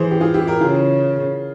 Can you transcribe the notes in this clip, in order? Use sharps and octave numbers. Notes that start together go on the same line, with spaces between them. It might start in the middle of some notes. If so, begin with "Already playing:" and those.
Already playing: E3 G#4 C5
G4
F4 G#4
E4 G4
G4 A#4
C#3 F4 G#4